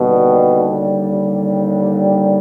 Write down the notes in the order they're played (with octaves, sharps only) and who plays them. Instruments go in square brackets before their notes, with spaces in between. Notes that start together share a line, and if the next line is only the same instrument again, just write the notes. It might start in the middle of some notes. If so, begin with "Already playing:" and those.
Already playing: [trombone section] D#2 D3 G3 [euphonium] B2